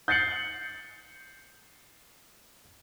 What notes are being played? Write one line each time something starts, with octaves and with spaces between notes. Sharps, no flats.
G6 A6 C7 C#7 F#7